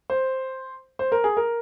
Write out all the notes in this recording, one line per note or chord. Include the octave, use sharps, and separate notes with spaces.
C5
C5
A#4
G#4
A#4